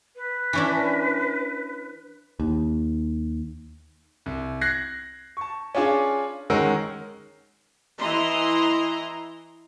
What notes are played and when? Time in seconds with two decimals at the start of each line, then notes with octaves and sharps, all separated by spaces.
0.15 B4
0.53 E3 C#4 D4
2.40 D#2
4.26 C2
4.61 F#6 G#6 A#6 C7
5.37 A5 C#6
5.75 C#4 D4 F4 G#4
6.50 D#3 G#3 C#4 A#4 F#5 E6
8.00 E3 E4 D#5 A#5 C6